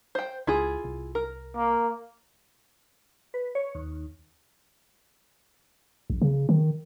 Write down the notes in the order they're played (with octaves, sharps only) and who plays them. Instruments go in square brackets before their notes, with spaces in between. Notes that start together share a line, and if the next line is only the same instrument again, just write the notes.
[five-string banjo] C5 G5
[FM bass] C#2 [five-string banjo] E4 F4 G#4
[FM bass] C2
[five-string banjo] A#4
[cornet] A#3
[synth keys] B4
C#5
D#2
[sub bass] A#1
C#3
D#3